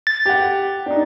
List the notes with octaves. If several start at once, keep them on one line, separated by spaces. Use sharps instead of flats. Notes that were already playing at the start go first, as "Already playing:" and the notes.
A6
G4 F#5
D4 D#4